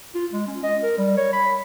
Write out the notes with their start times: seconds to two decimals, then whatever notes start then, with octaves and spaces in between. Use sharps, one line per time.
0.15 F4
0.32 G#3
0.47 C#4
0.63 D#5
0.83 A#4
0.98 G3
1.17 C#5
1.33 B5